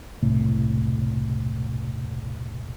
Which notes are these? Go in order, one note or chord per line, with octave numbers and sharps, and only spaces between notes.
E1 C2 A2